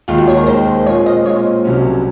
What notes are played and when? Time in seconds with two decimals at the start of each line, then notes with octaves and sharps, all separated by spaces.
0.08 D#2 D#3 G#3 F4
0.18 F#4
0.28 C#5
0.37 A#4
0.47 D#2 D#3 G#3 C5
0.86 A#2 G#3 C4 F4 G#4 C#5
1.06 D#5
1.25 A#2 G#3 C4 F4 G#4 C#5
1.64 C2 C3 F#3 C#4